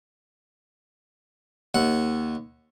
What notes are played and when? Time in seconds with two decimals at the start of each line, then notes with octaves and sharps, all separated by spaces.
1.74 D#2 F#5